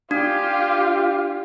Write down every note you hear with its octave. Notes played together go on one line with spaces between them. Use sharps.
D4 F4 G4